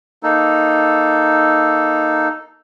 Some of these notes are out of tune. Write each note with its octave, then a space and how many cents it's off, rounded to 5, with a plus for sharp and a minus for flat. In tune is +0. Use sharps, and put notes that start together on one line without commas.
A#3 +0 D#4 +0 A4 +0